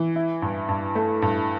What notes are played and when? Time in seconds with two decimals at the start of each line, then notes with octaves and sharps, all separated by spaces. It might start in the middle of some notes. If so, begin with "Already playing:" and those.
Already playing: E3
0.16 E4
0.42 G2
0.68 G2
0.95 A3
1.22 G2